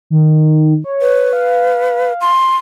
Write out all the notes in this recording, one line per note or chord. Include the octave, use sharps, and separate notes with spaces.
D#3
C#5
B4
F5
C6